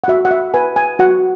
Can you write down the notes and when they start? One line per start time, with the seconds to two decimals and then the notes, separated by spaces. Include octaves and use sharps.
0.04 F#5
0.08 F#4 E5
0.25 F#5
0.31 E5
0.54 B4 G#5
0.76 G#5
0.99 F#4 F#5